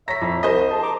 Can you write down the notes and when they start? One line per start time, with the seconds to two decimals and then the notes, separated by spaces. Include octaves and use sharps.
0.08 C#5 E5 A#5 A#6 B6
0.22 F2
0.43 C2 C5 D#5
0.71 D2 G#4 A5
0.83 A#5 D6